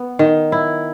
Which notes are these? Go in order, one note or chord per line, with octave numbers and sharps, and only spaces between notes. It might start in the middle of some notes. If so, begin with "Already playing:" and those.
Already playing: B3
D#3
E4